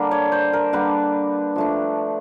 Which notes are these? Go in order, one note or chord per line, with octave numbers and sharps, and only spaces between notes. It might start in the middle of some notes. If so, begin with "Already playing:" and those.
Already playing: D3 G3 A#3 D4
C#5
C5
A#4
D3 G3 A#3 D4 B4
F3 A3 D4